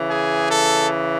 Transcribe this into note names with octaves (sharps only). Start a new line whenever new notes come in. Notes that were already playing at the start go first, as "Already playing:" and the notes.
Already playing: C#3 E3
G#4
A4